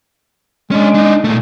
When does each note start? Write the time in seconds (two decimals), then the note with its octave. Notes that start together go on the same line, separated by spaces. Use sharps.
0.71 G#3 C#4 D4
0.95 D4 D#4
1.24 A#2 A3